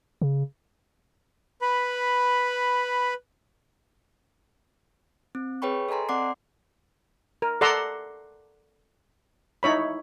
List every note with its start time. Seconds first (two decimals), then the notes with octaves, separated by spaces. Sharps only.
0.22 C#3
1.62 B4 B5
5.35 C4
5.62 G#4 B4 C#5 G5 B5 C#6
5.89 A4 D#5 G#5 A#5 C6
6.09 C4 D5 F#5 C6 D6 C7
7.42 A#4
7.61 A4 D5 F#5 A#5 C6 E6
9.63 D#4 E4 C#5 B5